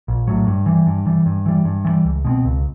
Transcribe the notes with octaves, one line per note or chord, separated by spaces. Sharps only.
A#1
A2 F#3
G2
E3 G3
G2
E3 G3
G2
E3 G3
G2
E3 G3
C#2
B2 G#3 C4
C#2